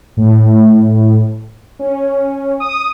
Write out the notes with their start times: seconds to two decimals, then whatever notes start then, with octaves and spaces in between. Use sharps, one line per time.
0.17 A2
1.79 C#4
2.60 D#6